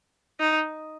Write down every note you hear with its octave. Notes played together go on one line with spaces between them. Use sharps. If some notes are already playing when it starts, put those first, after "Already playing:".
D#4